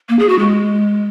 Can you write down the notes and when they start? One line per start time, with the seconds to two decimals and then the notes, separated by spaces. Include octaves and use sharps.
0.09 A#3
0.19 G#4
0.29 F#4
0.39 G#3